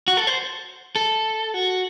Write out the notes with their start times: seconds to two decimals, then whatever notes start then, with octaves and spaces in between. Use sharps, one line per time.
0.08 F#4
0.17 A4
0.27 C5
0.96 A4
1.54 F#4